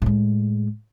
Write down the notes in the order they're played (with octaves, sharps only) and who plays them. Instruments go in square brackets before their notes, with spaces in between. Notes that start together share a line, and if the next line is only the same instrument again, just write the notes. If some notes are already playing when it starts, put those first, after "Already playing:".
[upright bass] A2 G#3